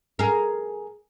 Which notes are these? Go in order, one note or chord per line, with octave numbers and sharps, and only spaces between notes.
G#4 A#4